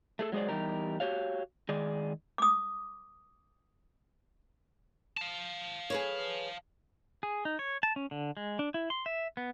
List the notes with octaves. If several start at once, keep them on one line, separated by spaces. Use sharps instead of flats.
A3 G#4 A4
F#3 G#3 G#4 C5 D5
E2 G3 D#4 G4 A#4
F#4 G4 C#5 F5
D#3 G#3 G#4 D5
D6 D#6
F5 A5
G#4 B4 C#5
G#4
D#4
C#5
A5
C#4
D3
G#3
D4
E4
C6
E5
B3